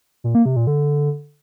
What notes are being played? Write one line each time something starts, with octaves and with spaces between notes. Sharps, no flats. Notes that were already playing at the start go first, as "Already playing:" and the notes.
A#2
A#3
C3
A#2
D3